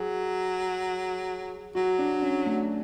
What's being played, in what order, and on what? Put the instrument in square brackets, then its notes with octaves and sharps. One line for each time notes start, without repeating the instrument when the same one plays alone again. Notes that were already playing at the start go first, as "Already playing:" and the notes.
Already playing: [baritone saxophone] F#3 [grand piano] G#4
[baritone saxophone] F#3 [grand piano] F#4
[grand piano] D4
C#4
A3